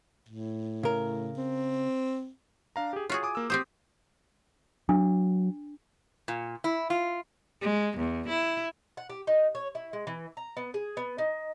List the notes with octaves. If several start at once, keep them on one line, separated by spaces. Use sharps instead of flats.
A2
C#3 A#4
C4
D4 F5 A#5
G4 G#4
F4 F#4 G#4 C#5
G#5 D6 D#6
A#3 E6
C4 G4 C5 D#6 C7
F#3 D4
A#2
E4
F4
G#3
E2
E4
F#5
G4
D#4
C#5
E4
G#3
E3
A#5
B3
G#4
B3
D#4